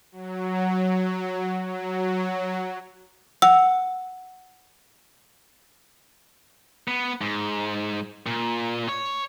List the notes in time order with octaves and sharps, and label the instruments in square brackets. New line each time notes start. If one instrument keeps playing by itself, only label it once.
[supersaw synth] F#3
F#3
[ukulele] F#5 [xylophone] E6
[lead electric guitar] B3
G#2
A#2
C#5